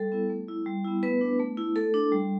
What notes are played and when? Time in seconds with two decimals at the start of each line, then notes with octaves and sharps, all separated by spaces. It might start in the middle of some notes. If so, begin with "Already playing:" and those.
Already playing: G3 A4
0.12 B3 E4
0.30 A3
0.48 E4
0.66 G3
0.85 B3 E4
1.03 A3 B3 B4
1.21 D4
1.39 A3
1.57 E4
1.76 A3 A4
1.94 D4
2.12 G3